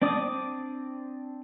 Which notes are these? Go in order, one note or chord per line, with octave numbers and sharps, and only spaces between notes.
C4 D4 D5 D6 D#6